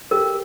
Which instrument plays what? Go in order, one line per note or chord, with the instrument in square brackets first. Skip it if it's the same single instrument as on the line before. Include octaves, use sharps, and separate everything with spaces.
[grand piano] G4 [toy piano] A#4